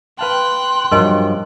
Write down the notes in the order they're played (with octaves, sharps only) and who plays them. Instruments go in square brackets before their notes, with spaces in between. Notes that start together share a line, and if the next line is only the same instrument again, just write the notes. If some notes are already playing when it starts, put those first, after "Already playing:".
[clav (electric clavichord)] B4 F5 A5 [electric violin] G5 F#6 [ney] C6
[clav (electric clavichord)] G2 F3 F#3 [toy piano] A#4 D#5 G#5